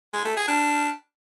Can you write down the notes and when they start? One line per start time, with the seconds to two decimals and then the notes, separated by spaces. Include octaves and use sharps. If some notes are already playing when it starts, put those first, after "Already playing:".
0.13 G#3
0.25 A3
0.36 G#4
0.48 D4